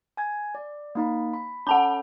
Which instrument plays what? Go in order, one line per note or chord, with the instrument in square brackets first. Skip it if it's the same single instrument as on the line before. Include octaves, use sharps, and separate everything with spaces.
[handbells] G#5 G#6
D5
A#3 D#4 B5
B5
[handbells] C#4 A4 [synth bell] F#5 A5 B5